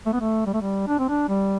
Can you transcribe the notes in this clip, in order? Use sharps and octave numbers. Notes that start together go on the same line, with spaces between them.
A3
B3
A3
G3
A3
G3
D4
C4
D4
G3